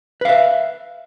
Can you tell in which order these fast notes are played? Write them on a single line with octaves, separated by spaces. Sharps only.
B4 F5 E5